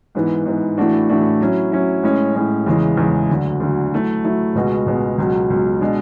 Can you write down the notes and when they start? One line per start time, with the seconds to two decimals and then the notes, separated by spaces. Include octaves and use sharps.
0.15 G#2 E3 B3
0.45 G#2 E3 B3
0.77 A2 E3 A3 D4 F#4
1.09 A2 E3 A3 D4 F#4
1.41 F#3 C#4 E4
1.72 F#3 C#4 E4
2.03 A2 G#3 C#4
2.35 A2 G#3 C#4
2.66 E2 C#3 E3 G#3
2.97 E2 C#3 E3 G#3
3.29 D2 D3 F#3
3.60 D2 D3 F#3
3.93 F#3 A3 E4
4.24 F#3 A3 E4
4.55 C#2 B2 G#3 B3 F#4
4.86 C#2 B2 G#3 B3 F#4
5.18 C#2 B2 F#3
5.50 C#2 B2 F#3
5.81 B2 G#3 D4